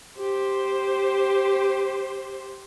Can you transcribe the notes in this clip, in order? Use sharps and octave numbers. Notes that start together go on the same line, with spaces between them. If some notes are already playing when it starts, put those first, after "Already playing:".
G4 C5